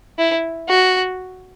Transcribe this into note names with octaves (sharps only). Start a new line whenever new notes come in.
E4
F#4